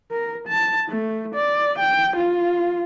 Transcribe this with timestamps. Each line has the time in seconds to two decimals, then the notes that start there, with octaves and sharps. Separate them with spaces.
0.11 A#4
0.48 A5
0.88 A3
1.35 D5
1.78 G5
2.16 F4